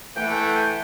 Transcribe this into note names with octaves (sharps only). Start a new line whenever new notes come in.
E3 A3 F#5 G5